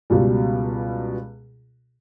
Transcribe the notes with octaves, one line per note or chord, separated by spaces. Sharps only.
C#2 B2 G3